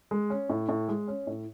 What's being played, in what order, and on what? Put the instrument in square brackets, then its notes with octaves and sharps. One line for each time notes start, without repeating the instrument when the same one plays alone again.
[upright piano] G#3
C#4
A2
A2
G#3
C#4
A2